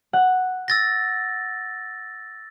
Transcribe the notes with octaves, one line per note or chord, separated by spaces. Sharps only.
F#5
E6 A6 A#6